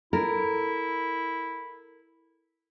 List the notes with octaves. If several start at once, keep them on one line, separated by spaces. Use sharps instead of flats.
E4 A4 A#4